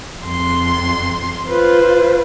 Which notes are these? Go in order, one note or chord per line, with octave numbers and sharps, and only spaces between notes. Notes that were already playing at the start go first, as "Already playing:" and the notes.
F2 C6
F4 B4 C5